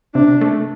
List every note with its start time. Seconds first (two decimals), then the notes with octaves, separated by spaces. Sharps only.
0.15 C3 D4
0.41 A3